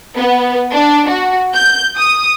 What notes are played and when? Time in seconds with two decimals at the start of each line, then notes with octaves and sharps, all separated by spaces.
0.17 B3
0.72 D4
1.09 F#4
1.55 G6
1.97 D#6